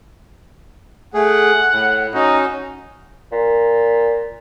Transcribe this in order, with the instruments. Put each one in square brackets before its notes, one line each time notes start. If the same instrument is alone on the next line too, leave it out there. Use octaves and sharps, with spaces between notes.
[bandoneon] A3 G#4 [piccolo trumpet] F#5
[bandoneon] A2
[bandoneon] C#4 F#4 [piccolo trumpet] D#4
[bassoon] A#2